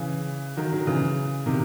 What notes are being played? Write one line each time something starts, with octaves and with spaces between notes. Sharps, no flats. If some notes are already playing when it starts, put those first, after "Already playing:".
Already playing: C#3 E3
D#3 F#3
D#3 F#3
C#3 E3
C3 D#3